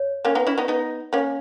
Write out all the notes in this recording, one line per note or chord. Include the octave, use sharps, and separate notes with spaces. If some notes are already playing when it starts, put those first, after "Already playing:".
Already playing: C#5
A#3 C#4
B3 D#4
C#4 E4
B3 D#4
B3 D#4
A#3 C#4